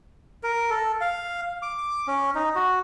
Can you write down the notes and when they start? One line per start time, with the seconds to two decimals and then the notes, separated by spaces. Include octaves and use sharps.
0.43 A#4
0.70 A4
1.01 F5
1.62 D6
2.08 C#4
2.35 D#4
2.56 F#4